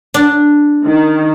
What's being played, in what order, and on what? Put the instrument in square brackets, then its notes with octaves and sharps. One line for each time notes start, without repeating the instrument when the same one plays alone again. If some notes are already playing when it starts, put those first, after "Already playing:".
[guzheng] D4
[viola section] D#3